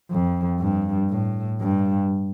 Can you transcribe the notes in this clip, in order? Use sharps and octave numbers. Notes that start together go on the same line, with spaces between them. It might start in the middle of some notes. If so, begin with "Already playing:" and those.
F2
G2
A2
G2